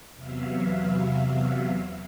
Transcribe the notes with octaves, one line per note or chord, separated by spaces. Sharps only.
E2 C3 F#3 B3 E5 F5